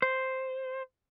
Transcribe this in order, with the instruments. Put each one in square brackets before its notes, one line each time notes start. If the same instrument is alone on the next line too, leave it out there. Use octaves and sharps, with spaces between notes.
[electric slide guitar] C5